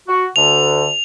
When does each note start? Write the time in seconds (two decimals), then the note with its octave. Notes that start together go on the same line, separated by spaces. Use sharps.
0.08 F#4
0.36 D2 D3 F7